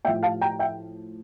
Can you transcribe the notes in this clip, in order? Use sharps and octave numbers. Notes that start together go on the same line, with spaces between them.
A2 F3 E5 G5
F5 A5
G5 A#5
E5 G5